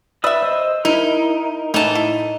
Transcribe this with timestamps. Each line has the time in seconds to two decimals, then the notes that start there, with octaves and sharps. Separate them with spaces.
0.24 B4 D5 E5 D#6 E6
0.42 C5 D#5
0.85 D#4 E4 A#4
1.74 A2 E3 D#4 A5
1.95 E4